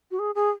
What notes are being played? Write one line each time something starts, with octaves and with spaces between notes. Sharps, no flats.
F#4
G#4
G#4